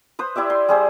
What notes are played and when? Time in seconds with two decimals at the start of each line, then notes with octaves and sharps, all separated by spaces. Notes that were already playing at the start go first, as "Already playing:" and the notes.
0.19 B4 C5 D#6
0.36 E4 G4 D5 E5
0.50 C6
0.68 G3 G#4 C5